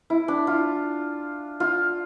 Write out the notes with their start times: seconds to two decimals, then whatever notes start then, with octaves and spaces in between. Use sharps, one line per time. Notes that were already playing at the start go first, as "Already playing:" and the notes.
0.10 E4
0.28 D4
0.47 F4
1.60 F4